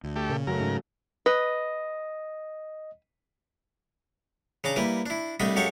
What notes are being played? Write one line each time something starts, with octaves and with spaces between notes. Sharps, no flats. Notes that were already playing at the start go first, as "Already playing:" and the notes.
D2
A3 G4
A#2 C#3
F#2 F#3 A3 A#4
G#2
B4 D#5
C#3 D4 A#5 D6
G3 A#3 E4 B4
D4 E4
C2 G3 A3 D4 D#5 B5
F#2 G#3 G4 A4 F5 C#6